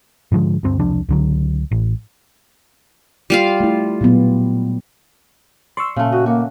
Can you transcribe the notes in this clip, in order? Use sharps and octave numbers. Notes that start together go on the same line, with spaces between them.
G#2 D3 F3 G#3
D2 G2 C4
E1 C2 F3 D4
C#2 D3 F#3
A1
G3 F4 F5
A3 E4
A#2 F#3 B3
D5 C6 C#6 E6
A#2 C#3 A3
F#4 D#5
A#3 F#4